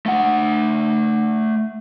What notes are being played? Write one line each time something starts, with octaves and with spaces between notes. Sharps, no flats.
A3 F#5